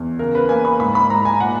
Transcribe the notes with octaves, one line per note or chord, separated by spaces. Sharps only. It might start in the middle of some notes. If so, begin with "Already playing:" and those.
Already playing: E2
C#3 A#4
B4
A#3 G#5
B5
G#2 B5
B5
G#2 A#5
G#5
A#2 F#5